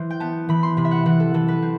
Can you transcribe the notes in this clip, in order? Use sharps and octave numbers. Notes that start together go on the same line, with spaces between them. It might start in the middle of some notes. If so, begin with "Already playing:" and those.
Already playing: E3 C5
G5
B3 A5
E3 B5
C6
C3 B5
E5
F#5
E3 F#5
A4
E3 A4
B4
C4